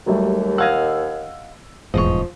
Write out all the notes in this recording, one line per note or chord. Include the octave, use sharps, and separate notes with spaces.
D#2 F#3 G3 A3
D#5 F5 F#5 E6 G#6
D#1 E2 G#2 F3 C#5 D#5